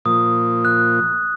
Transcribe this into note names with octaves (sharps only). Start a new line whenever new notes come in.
A#2 F3 A#3 D#6
F#6